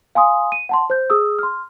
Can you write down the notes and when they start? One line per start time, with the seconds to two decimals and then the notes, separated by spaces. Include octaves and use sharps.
0.15 F5 G#5 C6 D#6
0.52 D#7
0.69 F#5 A5 C6
0.90 C5 G6
1.10 G#4 D#6 E6
1.39 C6 F6